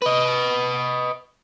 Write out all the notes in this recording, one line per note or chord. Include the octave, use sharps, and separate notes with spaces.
B4 D#5